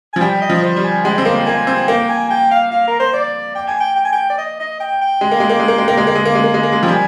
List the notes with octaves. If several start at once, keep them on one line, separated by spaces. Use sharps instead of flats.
G#5
F3
G3 G5
D#5
F3
C5
G3
G#5
G#3 G5
C4
A#3
A#3 G#5
C4
A#3 G5
G#5
G5
F5
F5
A#4
C5
D5
G5
G#5
G5
G5
G#5
G5
D5
D#5
D#5
G5
G5
G#3
A#3
G#3
A#3
G#3
A#3
G#3
A#3
G#3
A#3
G#3
A#3
G#3
A#3
G#3
A#3
G#3
F3 G5
G3 G#5